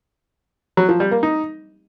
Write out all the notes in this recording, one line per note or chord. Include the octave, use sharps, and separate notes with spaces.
F#3
F3
G3
A#3
D#4